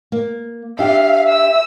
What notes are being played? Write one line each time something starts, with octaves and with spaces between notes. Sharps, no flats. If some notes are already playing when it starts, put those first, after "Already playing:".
A#3
D4 G4 E5 F5
E6